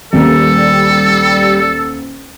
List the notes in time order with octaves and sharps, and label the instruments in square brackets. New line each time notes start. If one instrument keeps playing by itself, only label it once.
[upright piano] D#1 A#3 [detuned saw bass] G3 [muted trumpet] A4